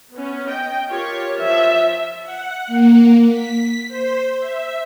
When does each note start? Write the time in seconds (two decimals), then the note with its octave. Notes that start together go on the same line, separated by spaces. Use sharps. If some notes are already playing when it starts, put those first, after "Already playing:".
0.13 B3 C#4
0.49 D#5 G5
0.87 F4 G4 A#4 C#5
1.41 F3 E5
2.22 F#5
2.67 A#3
3.29 B6
3.88 C5
4.39 E5